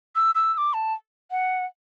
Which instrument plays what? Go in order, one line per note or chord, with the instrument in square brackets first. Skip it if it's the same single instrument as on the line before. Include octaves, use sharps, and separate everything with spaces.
[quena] E6
E6
E6
D6
A5
F#5